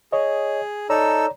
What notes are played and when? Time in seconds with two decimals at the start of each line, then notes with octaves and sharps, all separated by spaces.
0.13 G#4 C#5 D#5
0.90 D#4 A4 C#5 D5 A#5 E6